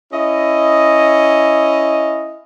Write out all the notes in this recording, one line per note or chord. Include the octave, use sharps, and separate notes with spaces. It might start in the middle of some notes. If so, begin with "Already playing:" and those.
C#4 E4 D#5